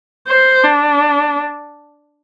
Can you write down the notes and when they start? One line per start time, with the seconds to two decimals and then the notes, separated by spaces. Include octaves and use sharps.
0.28 C5
0.64 D4